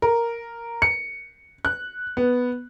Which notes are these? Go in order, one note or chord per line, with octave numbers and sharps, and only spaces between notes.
A#4
C#7
F#6
B3